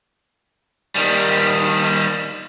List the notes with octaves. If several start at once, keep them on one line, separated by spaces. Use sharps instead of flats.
D#3 G3